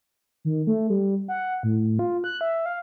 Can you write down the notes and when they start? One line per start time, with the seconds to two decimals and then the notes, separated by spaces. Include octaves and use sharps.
0.45 D#3
0.67 A3
0.90 G3
1.28 F#5
1.63 A2
1.99 F4
2.24 F#6
2.41 E5
2.66 F5